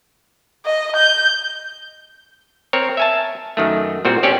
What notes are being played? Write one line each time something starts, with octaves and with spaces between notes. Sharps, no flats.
D#5
G6
C4 A#4 C#5
E5 G#5 A5
F#2 D#3 A3
A#2 G3 C4 F#4
C4 C#4 G4 C#5 D5